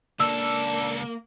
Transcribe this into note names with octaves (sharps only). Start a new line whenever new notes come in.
C#2 A#3 D4 A4 E6